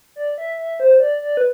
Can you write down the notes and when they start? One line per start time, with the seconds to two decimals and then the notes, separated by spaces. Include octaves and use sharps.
0.16 D5
0.38 E5
0.59 E5
0.80 C5
1.00 D5
1.22 D5
1.37 B4